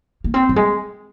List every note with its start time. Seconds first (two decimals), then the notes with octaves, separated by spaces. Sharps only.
0.24 A#3
0.34 C4
0.49 F#3
0.56 G#3